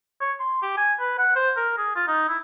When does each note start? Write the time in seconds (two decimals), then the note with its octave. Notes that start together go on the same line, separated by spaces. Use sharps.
0.21 C#5
0.40 C6
0.62 G4
0.77 G#5
1.00 B4
1.18 F#5
1.36 C5
1.56 A#4
1.78 G#4
1.96 F4
2.07 D#4
2.29 E4